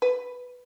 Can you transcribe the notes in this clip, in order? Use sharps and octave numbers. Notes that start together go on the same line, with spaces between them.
B4